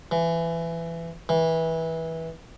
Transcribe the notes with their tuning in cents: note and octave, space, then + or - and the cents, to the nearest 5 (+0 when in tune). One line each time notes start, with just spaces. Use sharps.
E3 +20
E3 -20